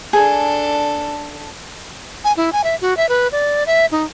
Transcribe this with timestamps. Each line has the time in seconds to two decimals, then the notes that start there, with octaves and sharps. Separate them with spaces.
0.13 D4 G#4 A4
2.24 G#5
2.37 E4
2.53 G#5
2.64 E5
2.81 F#4
2.97 E5
3.09 B4
3.32 D5
3.67 E5
3.91 D#4